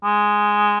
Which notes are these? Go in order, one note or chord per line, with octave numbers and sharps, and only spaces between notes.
G#3